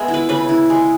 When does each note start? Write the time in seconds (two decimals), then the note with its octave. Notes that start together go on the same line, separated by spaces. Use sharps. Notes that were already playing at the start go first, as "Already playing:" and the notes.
Already playing: G#3 B3 E5
0.08 E4
0.14 B4
0.29 C#3 B4
0.49 E4
0.70 G#3